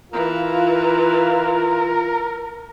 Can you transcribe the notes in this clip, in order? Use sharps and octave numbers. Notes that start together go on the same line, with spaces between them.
E3 F4 A#4